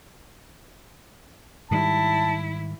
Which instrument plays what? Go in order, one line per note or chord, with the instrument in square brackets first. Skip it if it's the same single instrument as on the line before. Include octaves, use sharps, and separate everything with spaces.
[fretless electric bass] G#2 D#3 G3 [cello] E4 [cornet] A5